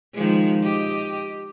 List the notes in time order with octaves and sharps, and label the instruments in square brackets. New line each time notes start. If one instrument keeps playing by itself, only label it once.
[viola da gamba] D#3 F3 G#3
G4 D#5